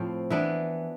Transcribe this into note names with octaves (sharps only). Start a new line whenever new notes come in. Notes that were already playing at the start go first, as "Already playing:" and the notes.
Already playing: A2 F3 C4
E3 B3 D4